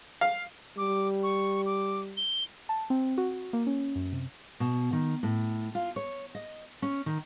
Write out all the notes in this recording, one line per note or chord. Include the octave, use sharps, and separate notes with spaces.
F5
G3 D6
C#6
D6
G7
A5
C4
F#4
F#4
A#3
C#4
F#2
C3
B2
D#3
A2
F4
C#5
D#5
C#4
D#3